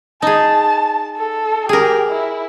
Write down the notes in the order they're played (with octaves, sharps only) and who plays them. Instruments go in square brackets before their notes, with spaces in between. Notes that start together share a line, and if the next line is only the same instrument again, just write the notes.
[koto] D#4 G#4 [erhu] A5
[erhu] A4
[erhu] G4 [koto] G#4 A#4
[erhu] E4